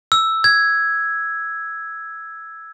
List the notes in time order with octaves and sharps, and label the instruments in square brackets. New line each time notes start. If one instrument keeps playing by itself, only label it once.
[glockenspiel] E6
G#6